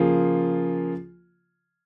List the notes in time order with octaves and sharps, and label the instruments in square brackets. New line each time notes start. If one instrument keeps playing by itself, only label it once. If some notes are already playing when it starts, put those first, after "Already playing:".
Already playing: [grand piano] C#3 F3 A#3 F4 G#4